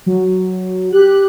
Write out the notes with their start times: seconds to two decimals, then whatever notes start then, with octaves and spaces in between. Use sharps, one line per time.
0.06 F#3
0.93 G4 F#6